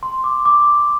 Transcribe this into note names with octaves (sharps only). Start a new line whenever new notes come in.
C6
D6
D6